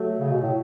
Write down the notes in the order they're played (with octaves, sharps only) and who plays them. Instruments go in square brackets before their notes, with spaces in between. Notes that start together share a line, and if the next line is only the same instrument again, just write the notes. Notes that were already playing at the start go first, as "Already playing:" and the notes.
Already playing: [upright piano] F#3 A3
[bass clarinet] C#3
B2
A2